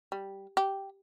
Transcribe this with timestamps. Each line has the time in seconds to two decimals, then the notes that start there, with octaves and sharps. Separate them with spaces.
0.12 G3
0.57 G4